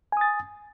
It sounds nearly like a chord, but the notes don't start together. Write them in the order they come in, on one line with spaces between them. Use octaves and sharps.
G#5 D#6 A6